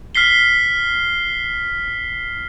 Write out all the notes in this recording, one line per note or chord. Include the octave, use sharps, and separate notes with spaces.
F6 B6 C7 G7